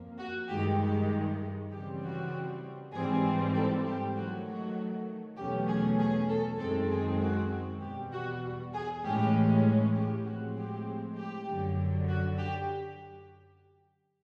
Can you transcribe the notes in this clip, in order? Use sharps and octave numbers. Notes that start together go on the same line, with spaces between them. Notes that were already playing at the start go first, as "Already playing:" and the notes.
Already playing: F2 F3 A#3
F#4
G2 D#3 G#3 G4
G4
C#3 E3 G3 C4 G4
F#4
G#2 E3 G3 C4 G#4
A4
G4
D#3 F#3 A3 F#4
F#4
E2 B2 F#3 A3 C#4 G4
G#4
G#4
A4
F#2 D#3 G#3 C4 A4
G#4
F#4
E2 B2 G3 G4
F#4
G#4
A2 E3 G#3 C#4 G4
G4
A2 F3 G#3 C4 F#4
G4
G4
F#2 D3 F#3
F#4
G4